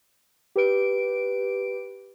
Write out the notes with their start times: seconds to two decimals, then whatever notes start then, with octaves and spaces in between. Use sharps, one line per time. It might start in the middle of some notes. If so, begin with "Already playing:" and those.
0.56 G4 B4 D7